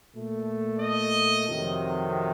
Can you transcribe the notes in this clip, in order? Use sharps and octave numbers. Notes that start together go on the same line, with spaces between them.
A#2 A3
D#5
F2 C3 D#3 F#3